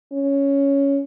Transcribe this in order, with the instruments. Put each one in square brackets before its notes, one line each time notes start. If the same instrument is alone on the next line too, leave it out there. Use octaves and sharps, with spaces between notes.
[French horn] C#4